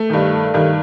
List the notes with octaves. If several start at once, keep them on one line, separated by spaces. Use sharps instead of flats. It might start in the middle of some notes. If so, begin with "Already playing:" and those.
Already playing: A3
G2 D#3
G2 D#3